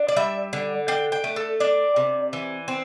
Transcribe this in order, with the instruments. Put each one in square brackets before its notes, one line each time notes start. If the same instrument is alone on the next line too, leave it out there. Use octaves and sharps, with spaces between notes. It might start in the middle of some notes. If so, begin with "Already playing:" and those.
Already playing: [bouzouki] D4
D5
G3 E5
D3
D4 G5
G5
A3
A4
D4 D5
C3
E3
C4